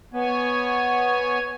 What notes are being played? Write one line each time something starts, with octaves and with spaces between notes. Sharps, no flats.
B3 C#5 G#5